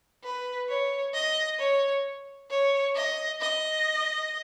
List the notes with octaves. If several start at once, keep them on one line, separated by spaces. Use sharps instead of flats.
B4
C#5
D#5
C#5
C#5
D#5
D#5